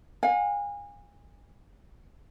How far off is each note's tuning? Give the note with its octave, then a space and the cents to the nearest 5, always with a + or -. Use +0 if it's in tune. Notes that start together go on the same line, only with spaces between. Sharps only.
F5 +45 G#5 -30